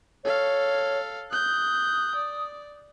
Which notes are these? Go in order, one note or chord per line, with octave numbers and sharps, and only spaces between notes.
A4 C#5 F5
D#6 F#6 G6
D5